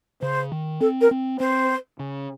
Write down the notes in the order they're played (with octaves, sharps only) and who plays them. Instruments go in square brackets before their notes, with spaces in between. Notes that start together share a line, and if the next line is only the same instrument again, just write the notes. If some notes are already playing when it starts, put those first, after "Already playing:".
[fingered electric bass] C#3 [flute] C5
[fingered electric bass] D#3
[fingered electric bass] C4 [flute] A4
[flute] A#4
[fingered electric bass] C4
[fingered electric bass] C4 [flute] C5
[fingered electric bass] C#3